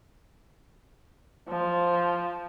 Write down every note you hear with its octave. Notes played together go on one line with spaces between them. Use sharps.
F3